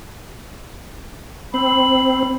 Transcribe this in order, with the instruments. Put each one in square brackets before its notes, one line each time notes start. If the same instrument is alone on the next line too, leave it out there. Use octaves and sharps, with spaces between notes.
[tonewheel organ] C4 [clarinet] B5